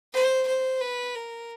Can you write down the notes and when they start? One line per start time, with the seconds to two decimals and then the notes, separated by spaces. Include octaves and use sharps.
0.13 C5
0.47 C5
0.81 B4
1.15 A#4